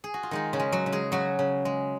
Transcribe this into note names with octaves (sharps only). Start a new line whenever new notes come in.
G#4
F#4
F4
D#3 G#3 D#4
C#3 C#4
G#3
F#3 F#4
C#3
G#3 G#4
C#3 F#3 F#4
C#3
G#3